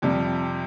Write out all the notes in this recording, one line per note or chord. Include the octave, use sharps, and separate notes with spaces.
F2 C3 G3